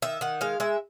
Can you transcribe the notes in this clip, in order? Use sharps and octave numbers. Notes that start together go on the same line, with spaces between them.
D#3 E5
D#3 F#5
G#3 F5
G#3 E5